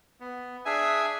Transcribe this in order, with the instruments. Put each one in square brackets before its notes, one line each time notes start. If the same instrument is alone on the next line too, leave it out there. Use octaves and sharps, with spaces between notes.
[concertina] B3
D4 G#4 E5 G#5